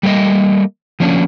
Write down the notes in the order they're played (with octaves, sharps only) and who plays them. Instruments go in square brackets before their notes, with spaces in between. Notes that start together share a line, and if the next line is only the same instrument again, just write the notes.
[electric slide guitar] G3 A3 A#3 C#5 D#5
F3 A#3 C#4 D4